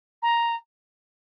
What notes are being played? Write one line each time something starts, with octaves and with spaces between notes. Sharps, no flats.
A#5